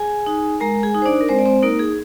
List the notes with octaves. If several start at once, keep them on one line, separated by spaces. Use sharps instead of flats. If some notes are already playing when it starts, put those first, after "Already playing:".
Already playing: G#4 G#5
D#4
G#3 A#4 A#5
G#4 G#5
D#4
C5
D4 D5
A#4
G#3 C4 C5
D5
C4 C5
A#3 D#4 A#4
G#4